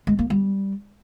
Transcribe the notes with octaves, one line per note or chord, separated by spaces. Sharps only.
G#3
A#3
G3